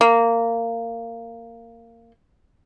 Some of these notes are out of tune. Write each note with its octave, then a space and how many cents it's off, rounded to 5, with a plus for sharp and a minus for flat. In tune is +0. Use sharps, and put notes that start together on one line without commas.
A#3 -15